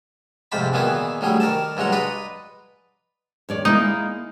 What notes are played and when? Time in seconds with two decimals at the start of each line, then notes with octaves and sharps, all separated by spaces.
0.52 F2 G#2 C3 C5 D5 B5
0.73 A#2 D#3 E3 B3 F#4 G#4
1.21 D2 F#3 G3 G#4
1.40 D#3 A#4 D5 A5
1.77 G2 F#3 G#3 F#5 A#5
1.92 B4 D5 D#5 A#5 C6
3.49 D#2 C#5 D5
3.65 G#3 A#3 D#4 E4